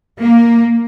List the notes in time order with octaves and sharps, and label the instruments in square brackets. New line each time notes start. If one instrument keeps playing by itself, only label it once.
[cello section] A#3